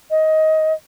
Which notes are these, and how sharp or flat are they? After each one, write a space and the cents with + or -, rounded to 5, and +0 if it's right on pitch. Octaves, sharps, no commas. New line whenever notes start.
D#5 +15